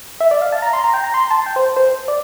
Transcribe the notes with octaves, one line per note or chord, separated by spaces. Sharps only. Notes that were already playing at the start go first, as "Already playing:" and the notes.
E5
D5
F5
A5
A#5
C6
A#5
G5
A#5
C6
A5
G5
C5
C5
D5